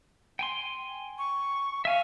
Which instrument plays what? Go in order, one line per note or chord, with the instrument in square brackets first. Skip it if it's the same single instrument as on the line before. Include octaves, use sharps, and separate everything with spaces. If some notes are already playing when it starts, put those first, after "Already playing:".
[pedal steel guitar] G5 G#5 C6
[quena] C#6
[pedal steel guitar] E5 G#5 C#6 [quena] F5